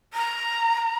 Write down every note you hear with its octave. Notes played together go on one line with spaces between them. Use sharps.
A#5